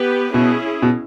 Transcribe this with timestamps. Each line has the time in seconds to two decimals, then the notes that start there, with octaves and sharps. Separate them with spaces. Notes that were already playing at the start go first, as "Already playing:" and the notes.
Already playing: B3 G4 B4
0.34 B2 C#4 E4 G#4
0.82 B2